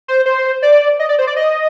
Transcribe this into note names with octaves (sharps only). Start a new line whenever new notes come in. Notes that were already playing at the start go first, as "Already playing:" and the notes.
C5
C5
D5
D#5
D5
C5
D5
D#5